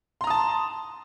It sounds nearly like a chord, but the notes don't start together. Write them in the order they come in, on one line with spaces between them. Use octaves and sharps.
C6 A#5 D#6 A5